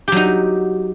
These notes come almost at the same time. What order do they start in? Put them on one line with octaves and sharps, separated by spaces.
G4 F#3 D#4